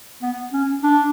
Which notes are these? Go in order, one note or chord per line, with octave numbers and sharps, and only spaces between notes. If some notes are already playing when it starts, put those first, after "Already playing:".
B3
C#4
D4